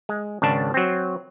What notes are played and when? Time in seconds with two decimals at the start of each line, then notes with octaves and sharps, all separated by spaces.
0.09 G#3
0.42 G#1 C#3 D4 A5
0.74 F#3 C4